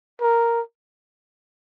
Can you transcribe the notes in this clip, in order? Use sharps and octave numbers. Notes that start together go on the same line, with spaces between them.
A#4